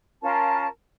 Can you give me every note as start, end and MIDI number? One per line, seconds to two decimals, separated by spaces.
0.22 0.67 61
0.22 0.67 65
0.22 0.67 70
0.22 0.67 81